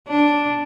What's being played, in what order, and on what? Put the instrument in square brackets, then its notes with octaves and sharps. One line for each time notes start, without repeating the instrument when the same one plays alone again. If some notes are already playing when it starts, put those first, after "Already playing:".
[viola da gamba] D4